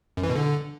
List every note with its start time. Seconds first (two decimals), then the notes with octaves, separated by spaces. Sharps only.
0.17 F#2
0.23 E3
0.29 B2
0.35 D3